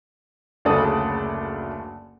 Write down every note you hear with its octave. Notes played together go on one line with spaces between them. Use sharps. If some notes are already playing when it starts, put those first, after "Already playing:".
F#1 D2 C#3 A4 D5 D#6